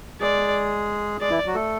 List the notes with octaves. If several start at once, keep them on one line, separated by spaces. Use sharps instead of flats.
G#3 G#4 D5
G#3 G#4 D5
E3 E4
F#3 F#4
A3 A4